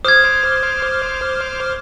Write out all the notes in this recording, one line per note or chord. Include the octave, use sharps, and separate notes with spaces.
C5 D6 D#6 F6 G#6